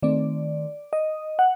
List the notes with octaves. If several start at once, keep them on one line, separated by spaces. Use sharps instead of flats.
D#3 A3 C4 D5
D#5
F#5